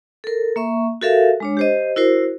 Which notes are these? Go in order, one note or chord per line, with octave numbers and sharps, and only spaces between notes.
A4 A#4
A#3 E5 C#6
F#4 G4 A4 A#4 E5 F5
G#3 D4 C#5
G4 C5 D#5
E4 F#4 A#4 C5